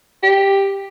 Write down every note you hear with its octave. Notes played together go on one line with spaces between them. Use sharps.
G4